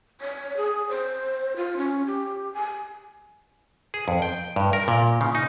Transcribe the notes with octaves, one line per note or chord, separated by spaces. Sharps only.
C#5
G#4
C5
F4
C#4
G4
G#5
G#4
F2
G5
G2
A#4
A#2
C#3
D#4